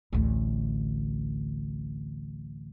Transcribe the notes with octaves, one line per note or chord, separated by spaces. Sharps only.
A1 D2